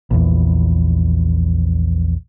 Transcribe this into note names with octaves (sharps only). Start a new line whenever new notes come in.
A#1 E2